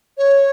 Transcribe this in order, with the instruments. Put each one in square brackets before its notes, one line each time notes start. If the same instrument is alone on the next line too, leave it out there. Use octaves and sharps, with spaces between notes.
[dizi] C#5